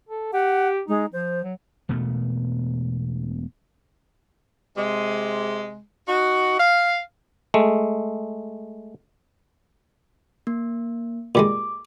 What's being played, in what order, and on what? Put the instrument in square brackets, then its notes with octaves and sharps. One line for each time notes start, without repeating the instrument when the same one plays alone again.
[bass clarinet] A4
[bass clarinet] G4 [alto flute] F#5
[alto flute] G#3 [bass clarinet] D#4
[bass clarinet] F3 [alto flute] C5
[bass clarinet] F#3
[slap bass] E1 B2 A3
[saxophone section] C3 G#3
D#4 F#4
F5
[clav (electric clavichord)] G#3 A3
[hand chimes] A#3
[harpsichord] A#2 G3 G#3 [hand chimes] D6